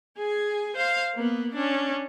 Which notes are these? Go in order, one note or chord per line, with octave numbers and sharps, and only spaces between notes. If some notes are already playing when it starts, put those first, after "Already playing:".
G#4 G#5
C5 F5
A#3 B3
C#4 D4